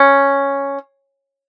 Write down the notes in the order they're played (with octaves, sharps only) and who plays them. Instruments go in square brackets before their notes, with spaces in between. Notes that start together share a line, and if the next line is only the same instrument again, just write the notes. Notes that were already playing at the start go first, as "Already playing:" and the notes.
Already playing: [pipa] C#4